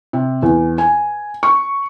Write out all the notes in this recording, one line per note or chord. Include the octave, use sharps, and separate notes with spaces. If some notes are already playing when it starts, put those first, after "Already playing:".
C3
E2
G#5
C#6